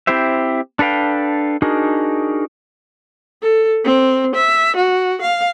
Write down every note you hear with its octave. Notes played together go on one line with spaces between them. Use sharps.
C4 E4 G4 C5 E5
D4 A4 B4 F5 G5
D4 D#4 F#4 G#4 A#4
A4
C4
E5
F#4
F5